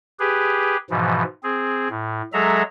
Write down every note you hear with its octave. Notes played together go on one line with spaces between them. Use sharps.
G4 G#4 B4
G#2 B2 E3 F3
C4 G#4
A2
F#3 G#3 G#4 A4 E5 A#5